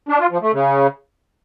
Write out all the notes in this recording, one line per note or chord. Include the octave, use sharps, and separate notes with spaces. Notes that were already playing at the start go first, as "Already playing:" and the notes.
D4
F4
F3
A3
C#3